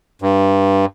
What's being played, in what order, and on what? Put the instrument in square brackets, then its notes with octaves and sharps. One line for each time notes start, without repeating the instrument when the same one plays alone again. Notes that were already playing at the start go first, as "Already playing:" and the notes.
[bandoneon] G2